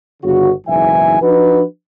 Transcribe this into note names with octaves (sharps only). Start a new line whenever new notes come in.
G1 C#3 F#4
F#1 B1 G#2 E3 E5 G#5
F3 D4 D#4 F#4 B4